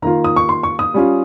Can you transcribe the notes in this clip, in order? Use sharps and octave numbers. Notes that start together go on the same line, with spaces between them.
D#3 A#3 F4 A#5
D#6
C#6
C6
C#6
D#6
G3 C#4 F4